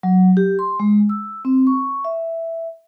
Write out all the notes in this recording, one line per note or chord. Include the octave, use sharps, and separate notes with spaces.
F#3
G4
C6
G#3
E6
C4
C#6
E5